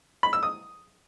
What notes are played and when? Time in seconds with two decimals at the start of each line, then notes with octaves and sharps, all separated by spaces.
0.23 B5
0.33 E6
0.43 D#6